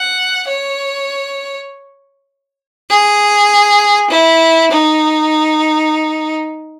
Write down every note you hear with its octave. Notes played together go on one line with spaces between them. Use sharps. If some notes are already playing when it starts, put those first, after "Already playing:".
Already playing: F#5
C#5
G#4
E4
D#4